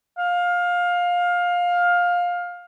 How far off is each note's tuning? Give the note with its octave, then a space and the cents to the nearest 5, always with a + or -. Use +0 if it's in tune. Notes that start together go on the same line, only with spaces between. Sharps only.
F5 +20